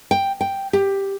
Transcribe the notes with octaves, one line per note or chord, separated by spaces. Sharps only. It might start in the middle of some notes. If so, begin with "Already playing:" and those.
G5
G5
G4